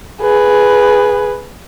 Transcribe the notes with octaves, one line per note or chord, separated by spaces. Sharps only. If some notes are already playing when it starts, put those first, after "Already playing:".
G#4 B4